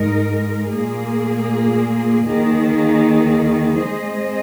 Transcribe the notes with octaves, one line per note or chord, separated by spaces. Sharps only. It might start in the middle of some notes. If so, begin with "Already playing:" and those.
Already playing: G#2 G#3 D#4 A#4
A#2 A#3 G#4
D#2 D#3 A#3 G#4
G#3 C4 G#4 C5 D#5